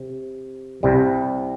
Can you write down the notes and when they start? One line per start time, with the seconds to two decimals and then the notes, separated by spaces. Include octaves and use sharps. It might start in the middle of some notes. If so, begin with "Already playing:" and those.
Already playing: C3
0.83 C2 C3 G3